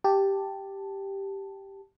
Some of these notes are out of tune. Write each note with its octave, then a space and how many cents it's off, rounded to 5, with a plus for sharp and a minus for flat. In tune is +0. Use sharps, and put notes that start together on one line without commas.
G4 +0 A5 +0